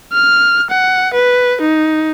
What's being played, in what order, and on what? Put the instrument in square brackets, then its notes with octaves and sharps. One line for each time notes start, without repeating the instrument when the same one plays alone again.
[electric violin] F6
F#5
B4
D#4